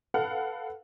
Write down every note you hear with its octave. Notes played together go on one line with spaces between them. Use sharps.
A4 B4 F5 F#5 F6